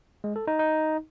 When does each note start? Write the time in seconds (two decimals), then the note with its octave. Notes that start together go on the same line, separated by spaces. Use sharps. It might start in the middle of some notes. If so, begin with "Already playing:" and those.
0.24 G#3
0.36 A4
0.47 D#4
0.59 D#4